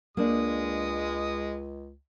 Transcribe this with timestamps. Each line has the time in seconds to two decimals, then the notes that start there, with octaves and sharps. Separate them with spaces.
0.17 C#2 G#3 A#3 D4 D#6